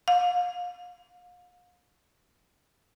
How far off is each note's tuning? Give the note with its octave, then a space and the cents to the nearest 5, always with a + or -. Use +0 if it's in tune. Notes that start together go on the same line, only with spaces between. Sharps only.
F5 +40